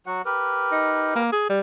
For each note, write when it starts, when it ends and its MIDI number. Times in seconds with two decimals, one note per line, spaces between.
0.06 0.22 54
0.06 0.22 66
0.06 0.22 78
0.25 1.23 67
0.25 1.23 70
0.25 1.23 71
0.72 1.15 63
1.16 1.29 58
1.32 1.45 68
1.49 1.60 55